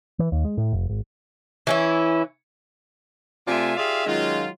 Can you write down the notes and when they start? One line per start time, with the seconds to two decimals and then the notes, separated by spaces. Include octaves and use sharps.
0.19 E3
0.32 D#2
0.45 G#3
0.57 A2
0.73 F1
0.89 G#1
1.67 E3 C#4 E4
3.48 C3 A3 F4 D5 E5 G#5
3.77 F4 G4 G#4 D5 E5 F5
4.06 D#3 F#3 G#3 C#4 F4